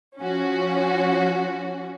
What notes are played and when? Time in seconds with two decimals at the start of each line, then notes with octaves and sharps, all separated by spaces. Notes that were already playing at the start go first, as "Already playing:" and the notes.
0.19 F3 C#4 F#4